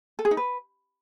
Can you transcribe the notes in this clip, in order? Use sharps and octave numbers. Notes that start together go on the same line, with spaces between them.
A4
G#4
D#4
B4